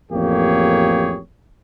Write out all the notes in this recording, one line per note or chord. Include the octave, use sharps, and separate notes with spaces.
A1 F2 A#3 G4 G#4 C#5